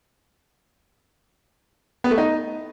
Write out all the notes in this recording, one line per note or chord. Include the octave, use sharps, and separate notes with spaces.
B3
A3
D#4